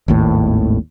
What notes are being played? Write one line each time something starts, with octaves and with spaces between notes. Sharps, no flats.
G#1 D#2 A2